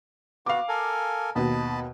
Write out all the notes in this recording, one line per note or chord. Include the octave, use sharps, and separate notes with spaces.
B3 F#4 F5 D6
A4 A#4 G#5
D#2 B2 D#5 A5 B5